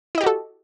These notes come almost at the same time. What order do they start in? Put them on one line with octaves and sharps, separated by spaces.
E4 D#5 G4 F#4 A4